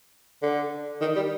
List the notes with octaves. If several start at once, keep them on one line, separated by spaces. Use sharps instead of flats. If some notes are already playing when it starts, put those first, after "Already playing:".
D3
D#3
G3